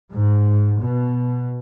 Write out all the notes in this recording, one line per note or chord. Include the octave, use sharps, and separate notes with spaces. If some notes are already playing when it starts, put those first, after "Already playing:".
G#2
B2